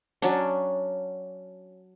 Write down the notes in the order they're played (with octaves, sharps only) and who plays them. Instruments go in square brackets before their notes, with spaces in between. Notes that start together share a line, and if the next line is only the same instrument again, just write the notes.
[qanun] F#3 C#4 D4